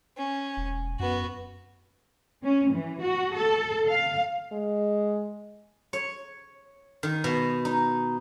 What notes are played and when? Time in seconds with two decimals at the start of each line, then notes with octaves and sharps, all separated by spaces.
0.17 C#4
0.57 E1
0.99 F#2 B3 F#4
2.44 C#4
2.73 E3
3.03 F#4
3.35 A4
3.88 F5
4.52 G#3
5.93 C#5
7.03 D#3
7.24 B2
7.65 D#4